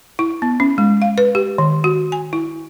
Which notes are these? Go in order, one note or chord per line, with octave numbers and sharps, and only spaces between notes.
E4
B3
C#4
G#3
F5
B4
G4
D#3
F#4
G#5
E4